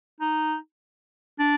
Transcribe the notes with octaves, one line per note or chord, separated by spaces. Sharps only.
D#4
D4